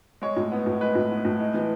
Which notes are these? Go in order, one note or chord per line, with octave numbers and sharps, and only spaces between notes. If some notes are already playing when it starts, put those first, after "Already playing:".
G#3 C#5
A2
B3
A2
G#3 B4
A2
B3
A2
G#3
E3